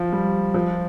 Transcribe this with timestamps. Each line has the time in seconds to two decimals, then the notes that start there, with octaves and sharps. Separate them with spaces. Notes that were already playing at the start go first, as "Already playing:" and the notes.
Already playing: F3
0.12 G3
0.54 F3